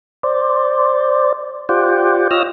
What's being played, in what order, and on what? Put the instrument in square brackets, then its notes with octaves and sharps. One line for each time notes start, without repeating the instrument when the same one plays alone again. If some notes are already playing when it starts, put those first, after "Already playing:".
[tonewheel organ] C5 D5
F4 G4 C5 D5 F#5 G5
F4 C#5 D#5 E6 F6 A#6